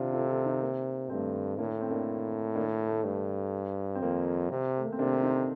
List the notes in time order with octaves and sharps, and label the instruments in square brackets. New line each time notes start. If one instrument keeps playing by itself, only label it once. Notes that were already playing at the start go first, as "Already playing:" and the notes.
Already playing: [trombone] C3 [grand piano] D4 F4
[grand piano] F4 A4
F4 A4
D#4 G4
A#3
[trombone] G2 [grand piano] A3 C4
[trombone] A2 [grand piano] A#3 D4
[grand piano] C4
A#3 D4
A#3 D4
A3
[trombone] G2
[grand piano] C4
[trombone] F2 [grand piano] A#3
[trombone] C3
[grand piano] A3
A#3
C4
[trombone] C3 [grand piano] A#3 D4
[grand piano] C4 D#4